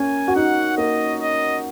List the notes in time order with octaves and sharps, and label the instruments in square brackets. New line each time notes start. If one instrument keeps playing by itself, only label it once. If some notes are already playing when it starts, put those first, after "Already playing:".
Already playing: [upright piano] A#3 C#4 [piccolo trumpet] G#5
[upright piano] F#4
[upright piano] D#4 [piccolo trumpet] F#5
[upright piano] A#3 [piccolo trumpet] D#5
[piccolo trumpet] D#5